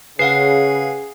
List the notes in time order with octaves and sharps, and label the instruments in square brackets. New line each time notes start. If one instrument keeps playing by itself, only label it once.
[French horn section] C#3 [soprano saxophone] G#4 [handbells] B4 F5 F#5 [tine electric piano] C7